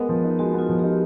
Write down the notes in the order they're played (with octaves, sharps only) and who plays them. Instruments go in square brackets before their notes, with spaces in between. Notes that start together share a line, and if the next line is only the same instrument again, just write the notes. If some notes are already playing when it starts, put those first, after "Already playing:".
Already playing: [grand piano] G#3 B3 [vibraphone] A#4
[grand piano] F3
D#4
[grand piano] G#3 [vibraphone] F#4
[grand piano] B3 [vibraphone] F4
[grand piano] F3
[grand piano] D#4 [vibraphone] G4